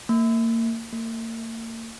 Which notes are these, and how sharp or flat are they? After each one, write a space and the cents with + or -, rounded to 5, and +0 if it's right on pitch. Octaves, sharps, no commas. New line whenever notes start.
A#3 -30
A#3 -40